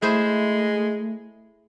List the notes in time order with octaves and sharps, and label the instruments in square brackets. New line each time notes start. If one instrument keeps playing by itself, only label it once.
[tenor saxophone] G#3 [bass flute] A3 [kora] E4 G#4 C5